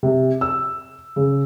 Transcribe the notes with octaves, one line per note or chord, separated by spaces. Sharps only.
C3
E6
C#3